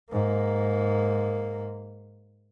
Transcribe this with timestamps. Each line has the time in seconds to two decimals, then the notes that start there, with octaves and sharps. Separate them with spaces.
0.11 G#2 A#3